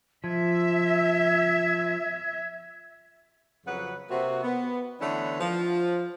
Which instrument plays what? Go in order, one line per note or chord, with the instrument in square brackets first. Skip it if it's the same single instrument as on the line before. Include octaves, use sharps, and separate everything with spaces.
[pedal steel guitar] F3 [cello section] E5 [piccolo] G#6
[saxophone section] F2 C#3 F#3 B4 F#5
C3 A#3 C4 F#4
B3
D3 E3 A3 B3 C#4 D4
F3